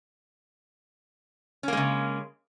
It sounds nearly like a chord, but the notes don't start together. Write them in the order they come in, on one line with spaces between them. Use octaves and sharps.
C#4 A#3 G#3 C#3